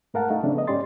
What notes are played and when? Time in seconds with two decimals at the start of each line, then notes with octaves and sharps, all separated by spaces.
0.14 G#2 A3 A#4 F5 F#5 A5
0.30 A3 D#4
0.43 C#3 F3 A3 C4 D4
0.55 B3 D#5
0.67 G#2 C#4 G4 D5 C6 A6